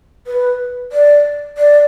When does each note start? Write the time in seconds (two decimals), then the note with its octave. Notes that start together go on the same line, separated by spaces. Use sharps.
0.27 B4
0.92 D5
1.58 D5